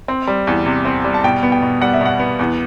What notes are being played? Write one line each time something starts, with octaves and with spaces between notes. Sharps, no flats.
C4
G3
E2
C3
C4
G3
A5
B2 G5
B3
G5
B2
G3 F#5
E5
B2 F#5
B3
E2